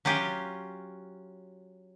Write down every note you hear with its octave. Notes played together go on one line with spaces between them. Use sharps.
F#3 C#4 F4 G4